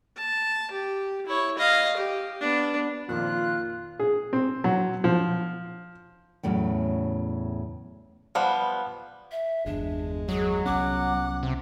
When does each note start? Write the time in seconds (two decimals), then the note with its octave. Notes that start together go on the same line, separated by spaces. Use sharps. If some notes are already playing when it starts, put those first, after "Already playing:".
0.17 A5
0.71 G4
1.27 E4 C#5
1.57 D#5 F5
1.97 G4
2.41 B3 D4
3.09 F2 A#2 D#3 F3 F4 F#6
4.00 G#4
4.33 C4
4.64 F#3
5.04 F3
6.43 E2 A2 C#3 F#3 C#4
8.35 F3 G3 B3 F5 F#5
9.31 E5
9.66 G1 E2 G#3 D4
10.29 F#3 G#4
10.66 C2 B3 C#4 F#5 D6
11.43 C3